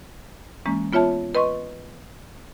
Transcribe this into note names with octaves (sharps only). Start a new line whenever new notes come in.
E3 G#3 A#3 C#4
B3 F4 C#5 E5 A5
B4 D#5 C6 C#6